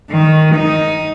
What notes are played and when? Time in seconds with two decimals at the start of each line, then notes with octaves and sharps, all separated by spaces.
0.11 D#3
0.55 D#4